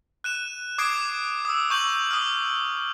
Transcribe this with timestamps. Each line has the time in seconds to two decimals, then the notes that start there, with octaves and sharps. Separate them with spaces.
0.24 F#6 D#7 E7
0.78 D6 D#6 G#6 C7 D7
1.45 D#6 E6
1.70 C#6 G6 F#7
2.11 D#6 F6